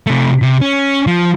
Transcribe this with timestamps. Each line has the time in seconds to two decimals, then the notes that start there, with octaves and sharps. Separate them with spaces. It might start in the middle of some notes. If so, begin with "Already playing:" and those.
0.07 C3 A3
0.42 C3
0.61 C#4
1.07 F3